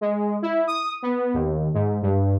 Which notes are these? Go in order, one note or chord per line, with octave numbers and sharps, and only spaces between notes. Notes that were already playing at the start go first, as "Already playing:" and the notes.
G#3
E4
D#6
B3
D#2
G#2
G2